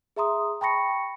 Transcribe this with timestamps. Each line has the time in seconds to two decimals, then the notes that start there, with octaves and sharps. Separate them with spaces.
0.16 G#4 E5 A#5 C6 D#6
0.61 G5 A5 B5 C#6 A#6 C#7